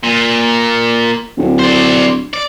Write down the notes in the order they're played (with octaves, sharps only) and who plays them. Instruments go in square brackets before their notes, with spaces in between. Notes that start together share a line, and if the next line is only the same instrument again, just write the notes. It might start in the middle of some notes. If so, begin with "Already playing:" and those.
[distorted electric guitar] A#2
[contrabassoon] D1
[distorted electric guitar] C5 D5
D5